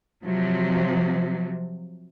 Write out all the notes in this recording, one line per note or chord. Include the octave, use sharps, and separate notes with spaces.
C3 F3 F#3